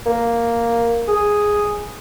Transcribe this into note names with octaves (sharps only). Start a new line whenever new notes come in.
A#3
G#4